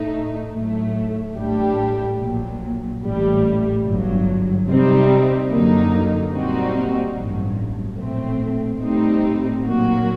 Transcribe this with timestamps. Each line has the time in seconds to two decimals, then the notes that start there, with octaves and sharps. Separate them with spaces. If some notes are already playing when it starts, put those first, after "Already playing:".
Already playing: A2 A3 D#4
0.54 A2 F#3 A3
1.36 A1 A2 G3 D4 G4
2.19 A#1 A#2 F#3
3.01 A1 A2 G3
3.85 G1 G2 F#3
4.67 C3 G3 C4 D#4
5.50 F#2 D3 F#3 A#3 D#4
6.33 A#2 G3 C4 D#4 F#4
7.16 A1 G2 F#3
7.98 A#1 A2 A3 C4
8.81 A2 G3 C4 D#4
9.63 A#2 F#3 A#3 F#4